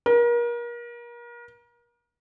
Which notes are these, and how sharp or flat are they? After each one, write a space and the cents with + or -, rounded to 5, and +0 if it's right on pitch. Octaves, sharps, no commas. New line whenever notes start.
A#4 +35